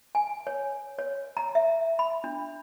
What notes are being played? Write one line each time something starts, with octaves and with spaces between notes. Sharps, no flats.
G#5
C#5
C#5
A#5
E5
B5
D4